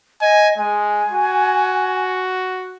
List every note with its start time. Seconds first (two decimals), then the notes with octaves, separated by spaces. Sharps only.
0.21 D#5 G#5
0.58 G#3 G#5
1.12 F#4